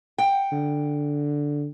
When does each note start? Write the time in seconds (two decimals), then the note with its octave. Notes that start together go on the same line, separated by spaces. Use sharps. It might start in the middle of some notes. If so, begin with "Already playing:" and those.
0.18 F#5 G5
0.52 D3